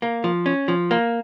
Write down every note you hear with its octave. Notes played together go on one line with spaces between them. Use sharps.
A#3
F3
C#4
F3
A#3